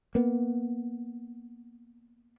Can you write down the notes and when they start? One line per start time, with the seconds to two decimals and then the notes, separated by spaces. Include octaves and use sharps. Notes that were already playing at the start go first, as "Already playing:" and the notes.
0.15 A#3 B3